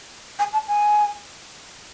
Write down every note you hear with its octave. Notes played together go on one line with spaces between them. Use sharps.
G#5
A5
G#5